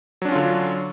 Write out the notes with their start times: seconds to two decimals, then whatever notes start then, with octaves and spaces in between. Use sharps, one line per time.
0.22 F#3
0.25 D4
0.28 C#4
0.32 F4
0.35 D3